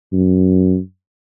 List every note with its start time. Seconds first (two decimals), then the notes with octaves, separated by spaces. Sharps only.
0.13 F#2